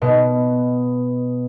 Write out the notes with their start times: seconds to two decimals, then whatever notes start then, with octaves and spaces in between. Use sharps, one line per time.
0.02 B2